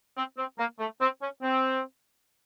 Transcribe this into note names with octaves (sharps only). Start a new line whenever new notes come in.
C4
C4
A#3
A3
C4
C#4
C4